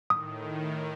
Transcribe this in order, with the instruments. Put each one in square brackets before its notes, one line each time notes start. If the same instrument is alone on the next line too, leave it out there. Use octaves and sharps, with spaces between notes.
[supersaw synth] A2 D#3 [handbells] D#6